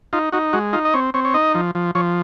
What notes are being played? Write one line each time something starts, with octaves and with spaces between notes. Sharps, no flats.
D#4 F4
D#4 F#4
G#3 F#4
D#4 F4
D#5
C4 C#5
C4 C#5
C#5
D#4 D#5
F3
F3
F3 C#5